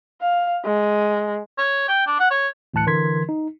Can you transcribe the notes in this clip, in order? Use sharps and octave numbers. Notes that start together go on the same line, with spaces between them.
F5
G#3
C#5
G5
D4
F#5
C#5
D2 A2 E3 A5 F#6 C#7
D3 E3 A#4 C6 G#6 B6
D#4